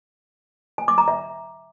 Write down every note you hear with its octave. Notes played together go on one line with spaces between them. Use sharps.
G#5
D6
A#5
E5